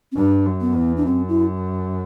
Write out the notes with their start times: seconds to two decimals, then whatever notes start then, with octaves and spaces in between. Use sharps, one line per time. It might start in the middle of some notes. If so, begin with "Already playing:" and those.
0.12 C4
0.16 G2 D4
0.46 F#2
0.61 B3
0.76 E2
0.97 D4
1.06 F#2 C4
1.28 E4